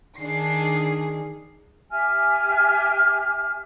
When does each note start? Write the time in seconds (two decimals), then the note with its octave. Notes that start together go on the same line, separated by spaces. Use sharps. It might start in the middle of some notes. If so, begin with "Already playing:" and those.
0.19 D#3 D4 G#4 C7
1.90 G4 E5 G#5 F6